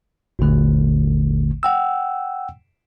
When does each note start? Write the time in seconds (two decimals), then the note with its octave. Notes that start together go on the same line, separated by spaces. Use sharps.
0.39 G#1 D#2 A#2 D3 A3
1.63 F#5 G5 E6